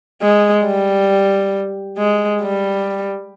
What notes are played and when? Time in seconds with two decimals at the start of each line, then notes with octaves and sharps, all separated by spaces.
0.22 G#3
0.66 G3
1.98 G#3
2.42 G3